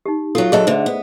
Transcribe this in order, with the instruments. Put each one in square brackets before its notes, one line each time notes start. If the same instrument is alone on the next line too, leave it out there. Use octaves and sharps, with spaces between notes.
[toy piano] D#4 G4
[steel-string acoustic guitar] F#3 F4 [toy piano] A4
[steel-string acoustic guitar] F2 F#3 A4 [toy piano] G#4 D#5 E5
[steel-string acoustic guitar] D2 D3 [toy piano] C5
[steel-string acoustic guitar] B3